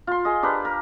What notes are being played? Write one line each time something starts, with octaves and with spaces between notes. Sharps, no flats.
F4 C6
G#4 D#5
D4 G4 A#4 B4
A#4